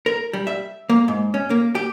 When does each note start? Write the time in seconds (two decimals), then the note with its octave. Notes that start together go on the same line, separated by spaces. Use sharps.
0.06 A#4
0.33 G3
0.47 E5
0.90 A#3
1.08 G#2
1.34 C#4
1.50 A#3
1.75 G4